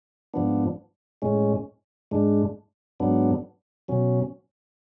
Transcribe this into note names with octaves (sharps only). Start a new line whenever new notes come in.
G#2 F3 B3 D4
A2 G#3 C#4
G#2 G#3 D4
G#2 F#3 B3 D4
B2 F#3 C#4